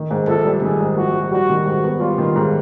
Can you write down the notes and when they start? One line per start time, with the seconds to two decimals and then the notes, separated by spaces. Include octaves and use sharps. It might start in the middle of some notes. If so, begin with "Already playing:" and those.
Already playing: D#3
0.11 G#2
0.28 A#1 A4
0.46 G3
0.62 D#3 G#4
0.80 G#2
0.97 A#1 F#4
1.15 G3
1.32 G3 F#4
1.50 D#3
1.66 G#2 F#4
1.84 B3
2.00 G3 F4
2.18 D#3
2.36 G#2